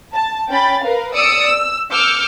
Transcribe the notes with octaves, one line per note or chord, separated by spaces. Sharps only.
A5
C#4 G5 B5 A6
A#4 B4 F5
D5 D#6 E6 C#7 D7
E6
D6 E6 F6 G6 C#7